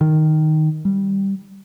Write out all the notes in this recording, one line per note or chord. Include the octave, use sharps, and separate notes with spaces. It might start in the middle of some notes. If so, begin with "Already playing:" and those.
D#3
G3